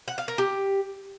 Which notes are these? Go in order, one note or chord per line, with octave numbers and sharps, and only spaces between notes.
F#5
F5
A#4
G4